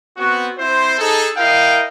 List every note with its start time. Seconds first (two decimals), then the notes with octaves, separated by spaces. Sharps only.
0.17 B3 C4 F#4
0.57 C4 E4 C5
0.99 D#4 G#4 A4
1.37 E4 A#4 D#5 F5 G5